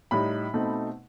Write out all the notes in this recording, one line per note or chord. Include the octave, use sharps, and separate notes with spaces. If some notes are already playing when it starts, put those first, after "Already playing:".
A2 G3 D#4 B5
B2 A3 C4 D#4